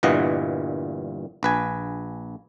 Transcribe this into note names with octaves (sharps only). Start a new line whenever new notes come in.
G1 G2 A#2 E3 D#5 F#5
A#1 B4 G#5